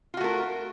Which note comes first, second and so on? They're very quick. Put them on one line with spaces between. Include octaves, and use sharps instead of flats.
F4 F#4 A3 A#4